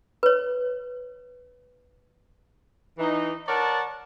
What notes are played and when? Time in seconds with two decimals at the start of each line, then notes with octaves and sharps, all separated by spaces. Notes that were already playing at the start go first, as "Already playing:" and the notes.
0.23 B4 C#5
2.99 E3 D#4
3.47 A#4 C#5 D5 F#5 A5